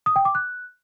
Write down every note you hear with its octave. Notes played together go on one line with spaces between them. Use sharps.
D#6
G5
D6
F#6